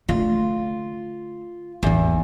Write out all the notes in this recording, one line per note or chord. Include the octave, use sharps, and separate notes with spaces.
D3 A3 F4
A1 E2 D#4